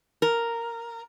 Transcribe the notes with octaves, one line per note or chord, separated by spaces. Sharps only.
A#4